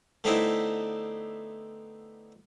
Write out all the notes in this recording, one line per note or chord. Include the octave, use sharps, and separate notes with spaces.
D3 A3 B3 C4 D#4 E4